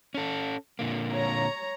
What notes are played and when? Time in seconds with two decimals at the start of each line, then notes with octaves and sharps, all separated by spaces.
0.14 C#4 A4
0.79 A#2 D3 A#3
1.12 C#5 A#5